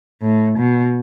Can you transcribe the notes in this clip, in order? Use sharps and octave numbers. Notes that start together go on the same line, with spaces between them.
A2
B2